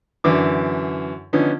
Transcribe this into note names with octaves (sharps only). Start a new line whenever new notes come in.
F#2 D3 E3 D6
D3 F3 B3 C#4 D#4